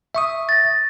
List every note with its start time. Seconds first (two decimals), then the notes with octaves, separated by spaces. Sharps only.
0.15 E5 C#6 D#6
0.49 A6 A#6